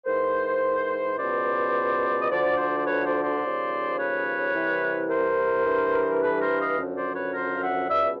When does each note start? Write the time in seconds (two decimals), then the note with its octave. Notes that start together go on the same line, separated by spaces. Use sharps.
0.05 G#2 E3 A#4 C5
1.17 C#2 B2 C5 D5
2.21 D#5
2.30 D2 D3 F3 C5 D5
2.57 C5 D5
2.77 C5
2.85 B4 C#5
3.04 C5 D5
3.22 C5 D5
3.41 D#2 C#3 F3
3.97 B4 C#5
4.54 C2 C3 E3
5.09 A#4 C5
5.65 G2 E3
6.22 A4 B4
6.40 A#4 C5
6.59 D#5 F5
6.77 F#2 D3 F3
6.96 C5 D5
7.14 B4 C#5
7.34 A#4 C5
7.54 F5
7.61 E5 F#5
7.89 C#2 B2 D5 E5